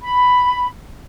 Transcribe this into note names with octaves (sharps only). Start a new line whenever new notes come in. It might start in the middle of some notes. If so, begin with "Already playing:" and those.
B5